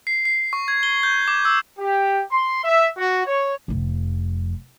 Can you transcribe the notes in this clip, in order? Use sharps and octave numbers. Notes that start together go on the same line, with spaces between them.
C7
C7
C#6
G#6
G7
G6
D6
E6
G4
C6
E5
F#4
C#5
F1 F2